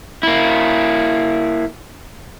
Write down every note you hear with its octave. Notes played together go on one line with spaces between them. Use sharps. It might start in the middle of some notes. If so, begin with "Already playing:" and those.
A#3 E4